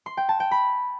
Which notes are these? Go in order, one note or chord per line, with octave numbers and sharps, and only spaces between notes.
C6
G5
A5
G5
B5